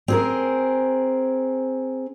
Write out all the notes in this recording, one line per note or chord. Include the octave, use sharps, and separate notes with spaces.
C4 G#4 A#4